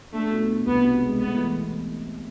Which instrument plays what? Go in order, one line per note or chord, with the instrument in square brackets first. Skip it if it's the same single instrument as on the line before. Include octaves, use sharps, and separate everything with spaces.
[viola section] A3 [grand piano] D4
[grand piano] B2
D4
[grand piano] C2 [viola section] B3
[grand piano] B2
G#3
[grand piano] A3 [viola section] B3
[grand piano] E3